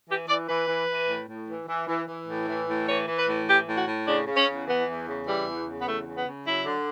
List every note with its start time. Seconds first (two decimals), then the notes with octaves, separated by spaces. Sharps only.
0.09 E3 G4
0.28 E3 D5
0.48 E3 B4
0.68 E3
0.88 E3
1.08 A2
1.29 A2
1.48 E3
1.68 E3
1.87 E3
2.07 E3
2.28 A2
2.48 E3
2.68 A2
2.87 E3 C#5
3.07 E3
3.17 B4
3.28 A2
3.47 E3 G4
3.67 A2
3.76 F#4
3.87 A2
4.07 C#3 D4
4.27 C#3
4.37 C#4
4.47 E2
4.67 E3 B3
4.86 E2
5.07 C#3
5.26 E3 G3
5.46 E2
5.66 C#3
5.80 B3
5.86 E2 A3
6.06 C#3
6.16 B3
6.26 C#3
6.45 F#3 E4
6.66 D3